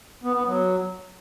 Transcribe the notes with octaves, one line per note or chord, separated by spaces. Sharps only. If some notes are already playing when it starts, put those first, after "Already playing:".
B3
B3
F#3